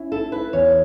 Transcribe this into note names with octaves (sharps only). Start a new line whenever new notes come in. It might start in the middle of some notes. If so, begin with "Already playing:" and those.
Already playing: C#4 E4
E4 A4
E4 B4
E2 C#5